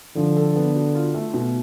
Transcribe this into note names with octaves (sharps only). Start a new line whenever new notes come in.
D3 F3
A4
B3
F#4
F4
A3
B2